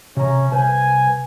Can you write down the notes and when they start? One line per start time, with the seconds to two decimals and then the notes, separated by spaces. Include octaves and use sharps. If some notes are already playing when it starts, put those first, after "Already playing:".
0.17 C3 C#4 A#5
0.52 C2 B4 C5 G#5